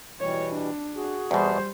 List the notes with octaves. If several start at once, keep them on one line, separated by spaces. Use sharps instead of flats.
B2 E3 G3 C#5
D4
F#4 G#4
E2 B2 G3 C5